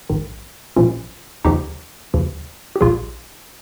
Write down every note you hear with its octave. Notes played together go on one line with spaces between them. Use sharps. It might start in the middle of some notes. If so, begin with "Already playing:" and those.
A#1 G#2 D#3
A#1 A#2 F3 C#4 F4
D#2 C#3 F3 D#4 G4
D#2 C#3 F3
G4
A#1 A#2 F3 F4 G#4